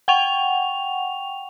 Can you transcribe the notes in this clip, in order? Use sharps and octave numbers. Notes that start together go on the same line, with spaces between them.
F#5 G5 C#6 F7